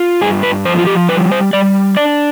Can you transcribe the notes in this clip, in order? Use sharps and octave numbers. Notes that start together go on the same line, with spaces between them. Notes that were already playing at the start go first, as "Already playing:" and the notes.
Already playing: F4
G2 G#4
B4
F3 C5
F4
G4
G3 B4
C5
G3 D5
D4 D5